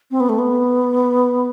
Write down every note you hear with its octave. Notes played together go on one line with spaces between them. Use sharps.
C4
B3
A3
B3